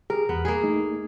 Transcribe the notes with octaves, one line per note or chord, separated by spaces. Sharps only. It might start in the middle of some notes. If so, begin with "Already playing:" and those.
G4 G#4 A#4
E2 B3
A#3 G#4
A3 D#4